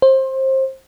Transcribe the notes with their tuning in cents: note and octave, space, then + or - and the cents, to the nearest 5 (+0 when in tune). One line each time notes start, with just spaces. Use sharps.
C5 +25